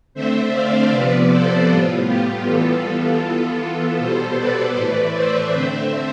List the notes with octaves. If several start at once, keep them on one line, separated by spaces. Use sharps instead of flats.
D3 A3 C4 C5 E5
D5 F5
C3 F3 B3 B4 D5
A4 C5
A2 G3 B3 F4
G4
E3 G3 B3 F4 A4
E3 B3
B2 G3 B3 A4 C5
B4 D5
A2 E3 A3
C5 E5
D3 A3 C4 C5 E5